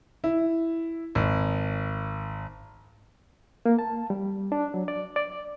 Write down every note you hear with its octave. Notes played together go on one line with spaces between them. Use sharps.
E4
G#1
A#3
A5
G3
D4
F#3
D5
D5